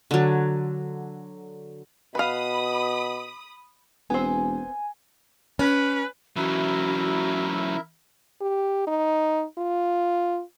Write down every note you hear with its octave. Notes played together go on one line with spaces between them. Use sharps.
D3 F#3
B2 B4 F5 B5 D#6
E1 B3 C4 G#5
C#4 B4
E3 F#3 C#4 E4 F#4 A#4 E5
G4
D#4
F4